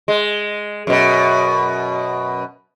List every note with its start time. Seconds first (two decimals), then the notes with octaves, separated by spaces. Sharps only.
0.08 G#3
0.87 F#2 B2